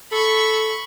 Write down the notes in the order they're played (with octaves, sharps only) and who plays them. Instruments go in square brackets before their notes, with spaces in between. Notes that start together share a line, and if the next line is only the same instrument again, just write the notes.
[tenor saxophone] A4 [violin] B5 C#6